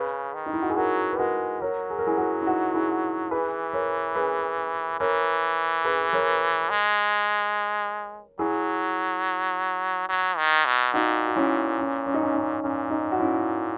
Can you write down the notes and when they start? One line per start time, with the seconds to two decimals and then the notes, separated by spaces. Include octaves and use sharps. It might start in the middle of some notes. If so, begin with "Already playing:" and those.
Already playing: C#3 G#4 B4
0.34 D#3
0.46 D#4
0.53 E4
0.62 F#4
0.70 G#4
0.76 F#3 F#4 A#4
1.13 B4
1.19 G#3 F#4 A#4
1.61 F#3 A#4 C#5
1.90 G#4
1.99 A#4
2.07 E4 G#4
2.18 F#4 A#4
2.42 E4
2.46 D#4 F#4
2.74 E4 G#4
3.31 E3 G#4 B4
3.73 A#4 C#5
4.15 G#4 B4
5.00 E3 A#4 C#5
5.85 G#4 B4
6.13 A#4 C#5
6.70 G#3
8.39 F#3 E4 G#4
10.09 F#3
10.37 D#3
10.66 B2
10.93 A#2 D#4 F#4
11.27 F#4
11.36 C#4 E4
11.78 C#4
12.06 C#4
12.14 D#4
12.23 C#4
12.35 D#4
12.63 A#2 C#4
12.91 D#4
13.12 F#4
13.19 C#4 E4